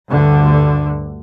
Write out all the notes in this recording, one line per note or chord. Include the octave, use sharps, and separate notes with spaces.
D2 G2 D3